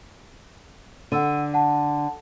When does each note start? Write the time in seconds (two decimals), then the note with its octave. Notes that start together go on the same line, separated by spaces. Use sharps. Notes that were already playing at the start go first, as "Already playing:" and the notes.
1.12 D3 F#5 E6 D#7
1.54 F#5 A5